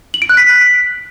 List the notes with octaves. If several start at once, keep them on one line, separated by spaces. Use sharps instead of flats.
F#7
D7
F#6
B6